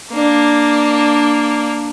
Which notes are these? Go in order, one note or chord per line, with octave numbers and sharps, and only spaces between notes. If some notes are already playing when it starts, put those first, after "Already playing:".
A#3 D4